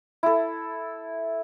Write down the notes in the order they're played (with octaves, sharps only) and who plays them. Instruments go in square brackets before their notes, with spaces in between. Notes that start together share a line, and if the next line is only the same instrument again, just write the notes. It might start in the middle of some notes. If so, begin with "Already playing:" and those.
[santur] E4 A4